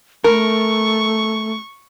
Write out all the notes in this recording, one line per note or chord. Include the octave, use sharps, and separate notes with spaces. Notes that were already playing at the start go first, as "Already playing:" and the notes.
A3 A#4 C#6